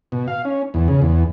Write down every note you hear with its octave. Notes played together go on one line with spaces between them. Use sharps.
B2
F5
C#4
E2
C#3
E2